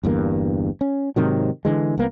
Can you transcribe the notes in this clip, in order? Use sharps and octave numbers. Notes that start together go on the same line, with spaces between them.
G1 E2 G2 A#3
C#4
G#2 C3 D#3 F#3
D3 E3 G#3
C2 A#3 B3